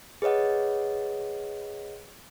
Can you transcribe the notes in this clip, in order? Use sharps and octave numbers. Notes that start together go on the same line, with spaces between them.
G#4 B4 C#5 D#5 F#5